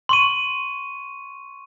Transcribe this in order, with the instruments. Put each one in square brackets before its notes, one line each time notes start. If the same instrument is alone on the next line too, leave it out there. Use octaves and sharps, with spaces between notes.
[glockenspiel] C6 C#6 D#7